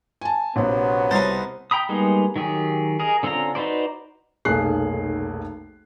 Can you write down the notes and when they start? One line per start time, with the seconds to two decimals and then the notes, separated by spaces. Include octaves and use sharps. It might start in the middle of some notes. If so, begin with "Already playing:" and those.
0.21 G#5 A5
0.56 A#1 C3 F#3 B3
1.11 C2 D#4 C5 A6
1.71 G5 A#5 B5 D#6
1.89 G3 G#3 A#3 B3 D#4
2.36 D#3 F#3 G4 G#4
3.00 G#4 A#4 D#5
3.23 D3 C4 C#4 F4 A#5
3.55 D#4 F#4 B4 C5 D5
4.45 F1 B1 A#3 G#4 F#6 C7